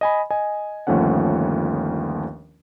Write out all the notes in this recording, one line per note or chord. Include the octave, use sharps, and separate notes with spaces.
D#5 G#5 B5
D#5 G#5
G1 D#2 F3 A3 C#4 F#5